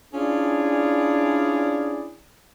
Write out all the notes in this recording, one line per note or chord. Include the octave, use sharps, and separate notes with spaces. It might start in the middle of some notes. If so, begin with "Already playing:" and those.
C#4 D4 E4 F4 G#4 D5